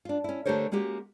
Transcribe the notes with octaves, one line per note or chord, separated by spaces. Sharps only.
D4 F4
C#4 E4
D3 A3 G4 A#4 C5 C#5
G#3 A#3 C#4 F#4 G4